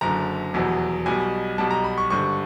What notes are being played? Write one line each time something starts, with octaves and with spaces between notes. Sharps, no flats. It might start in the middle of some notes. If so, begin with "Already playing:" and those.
F#1 F#2 D3 A#5
F1 E2 B2 F#3
B1 B2 G3 G#5
B1 B2 G3 A5
A#5
B5
C#6
G#1 G2 D3 C#6